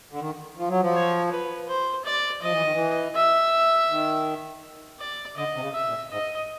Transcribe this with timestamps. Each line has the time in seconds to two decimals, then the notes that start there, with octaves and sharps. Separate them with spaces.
0.11 D3
0.20 D#3
0.57 F3
0.69 F#3
0.81 F3
0.94 C#5
1.31 B4
1.68 C5
2.05 D5
2.42 F3 D#5
2.52 E3
2.62 D#3
2.73 E3
3.15 E5
3.90 D#3
5.00 D5
5.36 D3 D#5
5.55 C3
5.61 C#3
5.73 E5
5.87 A#2
6.11 G#2 D#5